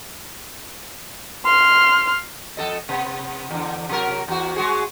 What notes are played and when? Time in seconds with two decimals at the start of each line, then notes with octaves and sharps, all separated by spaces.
1.45 C6 F6
2.57 F2 A4 D#5
2.89 C3 B3
3.51 E2 D3
3.89 C3 F#3 A#4
4.28 E2 F#4
4.56 G#3 F#4 G#4